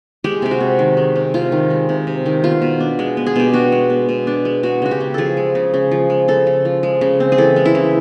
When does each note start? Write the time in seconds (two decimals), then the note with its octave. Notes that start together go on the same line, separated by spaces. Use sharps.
0.24 G#3 G4
0.42 C3 G4
0.51 F#4
0.61 C3
0.79 D#3
0.97 G#3
1.16 C3
1.34 C3 F4
1.52 D#3
1.70 G#3
1.89 C3
2.07 C3
2.26 D#3
2.44 B3 F4
2.62 B2
2.80 D4
2.99 G#3
3.17 B3
3.26 G#4
3.36 B2 G4
3.53 D4 F#4
3.72 G#3
3.90 B3
4.09 B2
4.27 D4
4.45 G#3
4.63 G#3 F#4
4.82 C#3 F#4
4.91 G4
5.00 C#3
5.14 F3 G#4 A4
5.37 G#3
5.55 C#3
5.74 C#3
5.91 F3
6.10 G#3
6.28 C#3 A4
6.47 C#3
6.65 F3
6.83 G#3
7.01 C#3
7.20 C4
7.32 G#4
7.38 E3 A4
7.56 G#3
7.65 E4
7.75 C#3